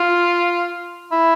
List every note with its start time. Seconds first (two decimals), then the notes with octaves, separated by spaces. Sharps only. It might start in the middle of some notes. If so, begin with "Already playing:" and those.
Already playing: F4
1.12 E4